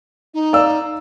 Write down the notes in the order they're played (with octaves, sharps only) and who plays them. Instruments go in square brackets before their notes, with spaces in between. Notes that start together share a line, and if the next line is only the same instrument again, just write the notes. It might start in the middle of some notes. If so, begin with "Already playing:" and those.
[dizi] D#4
[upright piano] D5 F5 E6